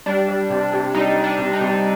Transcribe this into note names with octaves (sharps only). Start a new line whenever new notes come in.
G3 D4
G3
C3
C3
G3 D#4
G3
D4
C3
D#4
C3